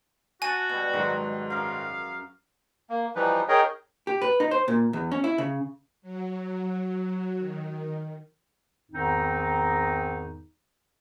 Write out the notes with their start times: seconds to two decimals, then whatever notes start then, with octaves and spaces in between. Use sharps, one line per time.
0.42 F#4 F#5 G#5 A5 D#7
0.69 B2 G3
0.93 G#2 D#3 F#3 G#3
1.50 F#2 A#4 F5
2.90 A#3
3.16 E3 F3 G3 D#4 B4
3.49 D#4 G#4 A#4 C#5 D#5 G5
4.07 G4
4.21 B4
4.40 D#4
4.51 C5
4.68 A#2
4.93 E2
5.11 C#4
5.24 E4
5.38 C#3
6.02 F#3
7.38 D#3
8.91 E2 G#2 D#3 C4 D#4